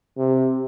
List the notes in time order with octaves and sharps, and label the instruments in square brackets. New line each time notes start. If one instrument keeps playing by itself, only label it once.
[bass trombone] C3